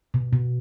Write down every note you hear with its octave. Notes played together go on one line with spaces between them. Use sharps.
B2
B2